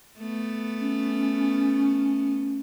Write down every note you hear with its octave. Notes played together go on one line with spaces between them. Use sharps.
A3 B3
C#4